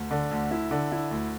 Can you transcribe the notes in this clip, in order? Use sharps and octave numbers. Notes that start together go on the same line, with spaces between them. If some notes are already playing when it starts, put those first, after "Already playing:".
Already playing: D2
D3
D2
E4
D3
E4
D2